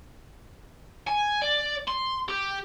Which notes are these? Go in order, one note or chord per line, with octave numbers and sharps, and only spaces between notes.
G#5
D5
C6
G4